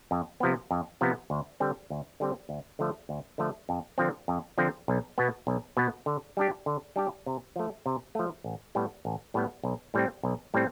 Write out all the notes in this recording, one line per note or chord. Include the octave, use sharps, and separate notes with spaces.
F2
C3 F3 B3
F2
C3 F3 B3
D2
D3 G3 C4
D2
D3 G3 C4
D2
D3 F3 A3
D2
D3 F3 A3
F2
D3 F3 C4
F2
D3 F3 C4
B1
B2 B3
B1
B2 B3
D3
G3 D4 G4
D3
G3 D4 G4
C3
F3 A3
C3
F3 A3
A1
A2 G3 B3
A1
A2 G3 B3
B1
A2 G3 C4
B1
A2 G3 C4